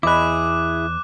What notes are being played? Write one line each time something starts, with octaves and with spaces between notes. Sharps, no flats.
E2 E4 G#4 D#5 B5 D6 F#6